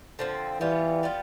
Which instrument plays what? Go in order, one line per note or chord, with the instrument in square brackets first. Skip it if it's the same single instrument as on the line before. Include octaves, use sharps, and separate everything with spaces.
[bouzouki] D3 F3 C4
[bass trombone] E3 [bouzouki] G3 B3 F4
[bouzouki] G3 B3 F4